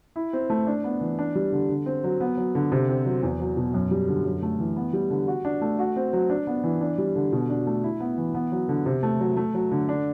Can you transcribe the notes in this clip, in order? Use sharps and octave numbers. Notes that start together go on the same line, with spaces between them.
E4
C4
A3
D4
B3
E3
D4
G3
D3
D3
C4
F#3
B3
F#3
D3
C3
C4
F#3
E2
F#3
B2
F#2
G3
D3
F#2
A3
E3
B3
G3
D3
F#4
D4
A3
F#4
C4
F#3
D4
B3
E3
D4
G3
D3
B2
D4
A3
E4
B3
E3
B3
F#3
D3
C3
A3
F#3
A3
F#3
D3
D4